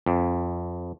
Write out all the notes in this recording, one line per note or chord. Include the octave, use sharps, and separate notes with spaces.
F2